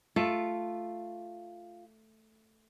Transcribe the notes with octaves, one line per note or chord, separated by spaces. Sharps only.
A3 F4